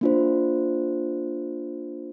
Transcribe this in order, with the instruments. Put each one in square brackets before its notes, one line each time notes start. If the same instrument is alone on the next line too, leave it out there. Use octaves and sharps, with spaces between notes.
[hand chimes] A#3 D4 F4 C5